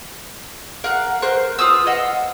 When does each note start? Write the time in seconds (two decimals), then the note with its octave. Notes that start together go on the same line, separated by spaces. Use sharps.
0.84 A#4 F5 F#5 F#6
1.22 A#4 C5 F#6
1.59 F4 B4 D#6 E6
1.87 D#5 F5 F#5 E6